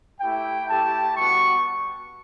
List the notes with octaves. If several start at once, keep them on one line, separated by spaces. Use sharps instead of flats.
A3 E4 G4 G5
A3 E4 G4 A5
G3 B3 F#4 C#6